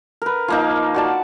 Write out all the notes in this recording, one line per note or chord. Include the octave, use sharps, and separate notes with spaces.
A#4 B4
F3 A#3 D#4
F#4 D5 A5